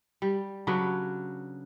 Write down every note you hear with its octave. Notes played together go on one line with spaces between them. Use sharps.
G3
C#3 F#3 D4 B4